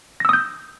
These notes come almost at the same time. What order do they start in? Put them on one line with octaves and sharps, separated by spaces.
A#6 E6 D#6 G6